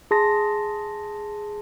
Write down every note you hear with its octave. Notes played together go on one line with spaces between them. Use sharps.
G#4 A5 C6 A#6